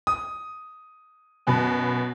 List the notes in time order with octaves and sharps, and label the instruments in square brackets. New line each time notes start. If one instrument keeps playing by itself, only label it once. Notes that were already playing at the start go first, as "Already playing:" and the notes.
[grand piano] D#6
[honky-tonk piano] F#2 B2 B5